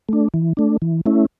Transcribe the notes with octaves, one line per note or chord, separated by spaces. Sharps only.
A3 D4
E3
A3 D4
E3
A3 C#4 E4